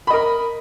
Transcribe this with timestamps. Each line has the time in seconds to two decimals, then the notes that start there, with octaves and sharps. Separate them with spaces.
0.07 B5
0.10 D#5
0.13 A#4